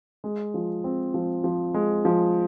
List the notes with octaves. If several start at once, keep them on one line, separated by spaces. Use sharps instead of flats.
G#3
F3
C4
F3
F3
G#3
F3